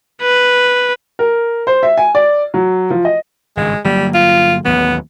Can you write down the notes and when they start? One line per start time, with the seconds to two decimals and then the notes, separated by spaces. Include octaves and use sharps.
0.22 B4
1.19 A#4
1.67 C5
1.83 E5
1.97 G#5
2.15 D5
2.54 F#3
2.90 F3
3.05 D#5
3.57 G#1 G2 C#3 G#3
3.84 G1 F#3 G3 A#3
4.14 F4
4.65 A1 D#2 F#3 B3